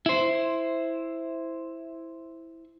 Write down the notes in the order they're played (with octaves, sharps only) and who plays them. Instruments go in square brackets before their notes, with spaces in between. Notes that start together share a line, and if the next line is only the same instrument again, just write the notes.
[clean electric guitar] E4 C5